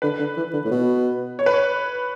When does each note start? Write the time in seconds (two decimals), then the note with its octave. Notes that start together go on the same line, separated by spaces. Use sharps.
0.02 D3 B4
0.19 D3
0.37 E3
0.53 D3
0.65 A2
0.71 B2
1.39 C#5
1.46 B4
1.54 C#5